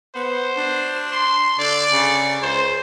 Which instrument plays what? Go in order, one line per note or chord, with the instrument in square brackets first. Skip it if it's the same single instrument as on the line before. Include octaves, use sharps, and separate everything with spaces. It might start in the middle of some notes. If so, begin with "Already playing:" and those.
[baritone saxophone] B3 [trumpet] C5
[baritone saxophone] D4
[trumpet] C6
[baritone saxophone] D3 [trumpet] D5
[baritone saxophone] C#3
[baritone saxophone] C#2 [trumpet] C5